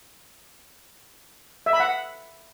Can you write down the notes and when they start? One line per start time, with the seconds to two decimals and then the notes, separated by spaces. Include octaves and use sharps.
1.66 E5
1.73 B5
1.80 F#5